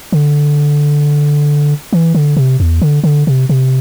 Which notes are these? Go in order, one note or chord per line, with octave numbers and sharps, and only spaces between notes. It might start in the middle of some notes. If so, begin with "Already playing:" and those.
D3
E3
D3
C3
E2
D3
D3
C3
C3